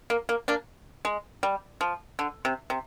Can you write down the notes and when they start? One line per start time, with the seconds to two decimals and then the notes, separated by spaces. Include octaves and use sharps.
0.10 A#3
0.29 A#3
0.48 A#3 D4
1.05 G#3
1.43 G3
1.81 F3
2.19 D3
2.45 C3
2.70 C3